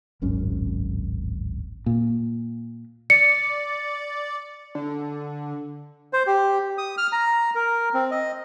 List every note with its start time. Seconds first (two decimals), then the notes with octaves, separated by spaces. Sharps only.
0.22 D1 G#1 F#2 C#4
1.86 A#2
3.10 D5 C#7
4.75 D3
6.13 C5
6.27 G4
6.78 D#6
6.98 F6
7.12 A#5
7.55 A#4
7.94 C4
8.11 D#5